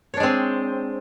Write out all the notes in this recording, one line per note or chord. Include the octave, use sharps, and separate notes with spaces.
G#3 C4 D4 C#5